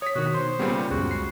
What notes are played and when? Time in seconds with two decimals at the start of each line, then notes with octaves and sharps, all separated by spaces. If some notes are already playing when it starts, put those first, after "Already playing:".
0.02 C#5 D#6 B6
0.16 B2 D#3 F#4
0.34 C5 C6
0.59 A#2 C#3 G3 B3 B5
0.91 C#2 F#2 C#3 F#4
1.11 C7